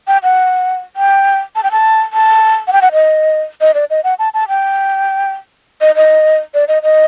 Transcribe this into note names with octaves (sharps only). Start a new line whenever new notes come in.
G5
F#5
G5
A5
G5
A5
A5
F#5
G5
F#5
D#5
D#5
D5
D#5
F#5
A5
A5
G5
D#5
D#5
D5
D#5
D#5